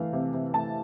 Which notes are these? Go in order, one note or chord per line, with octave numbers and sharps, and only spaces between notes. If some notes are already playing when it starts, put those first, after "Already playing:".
Already playing: E3 A3 F5
C3
C3
A3 A5